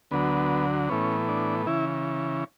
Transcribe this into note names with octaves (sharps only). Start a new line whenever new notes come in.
D2 D3 F#3 B3
A2 E3 B3 C#4
D4
C#3 E3 E4